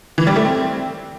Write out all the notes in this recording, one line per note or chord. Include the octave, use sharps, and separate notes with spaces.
E3
G3
A3
C4